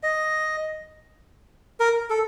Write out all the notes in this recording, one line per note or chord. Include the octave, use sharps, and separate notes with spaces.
D#5
A#4
A4